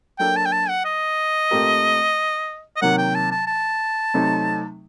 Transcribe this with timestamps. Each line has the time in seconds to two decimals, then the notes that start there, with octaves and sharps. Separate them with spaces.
0.19 F#3 A#3 D4 A4 G5
0.36 A5
0.46 G5
0.52 A5
0.69 F#5
0.85 D#5
1.51 A#2 A3 C4 G4 A#4
2.76 D#5
2.81 C3 D#3 F#3 A#3 F#5
2.98 G5
3.15 A5
3.31 A5
3.47 A5
4.14 C3 F#3 A3 C4 D#4